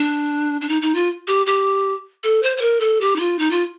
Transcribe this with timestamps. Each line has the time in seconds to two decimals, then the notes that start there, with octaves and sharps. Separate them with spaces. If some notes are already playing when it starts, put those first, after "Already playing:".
Already playing: D4
0.61 D4
0.69 D#4
0.82 D#4
0.95 F4
1.28 G4
1.46 G4
2.24 A4
2.43 C5
2.57 C5
2.61 A#4
2.80 A4
3.01 G4
3.16 D#4
3.20 F4
3.39 D#4
3.51 F4